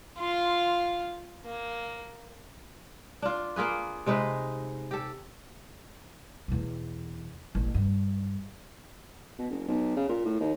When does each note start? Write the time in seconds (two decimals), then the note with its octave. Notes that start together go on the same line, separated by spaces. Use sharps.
0.18 F4 F5
1.45 A#3
3.22 D4 F4
3.56 A#3 F4 G#4 B4
4.06 C3 G#3 D#4 B4
4.91 G4 A4
6.48 E2 B2
7.55 A1 A#2
7.74 G2
9.39 B2
9.50 F#1
9.68 B1
9.96 C#3
10.09 A#2
10.25 A2
10.40 D#2